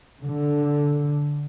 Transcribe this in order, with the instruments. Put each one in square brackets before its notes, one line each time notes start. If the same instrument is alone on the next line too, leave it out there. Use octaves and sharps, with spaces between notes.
[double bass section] D3